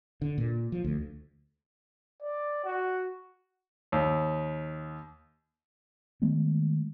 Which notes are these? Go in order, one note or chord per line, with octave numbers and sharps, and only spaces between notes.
D3
A#2
F3
D2
D5
F#4
D#2
D#3 G#3 A3 B3